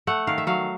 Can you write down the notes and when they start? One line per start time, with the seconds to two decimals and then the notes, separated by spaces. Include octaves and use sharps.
0.07 A3 F#5
0.27 D#3 F5
0.38 E5
0.47 F#3 F5